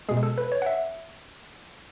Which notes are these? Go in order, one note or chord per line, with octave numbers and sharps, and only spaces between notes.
B2 G#3 G#4
A4
B4
C#5
F#5
E5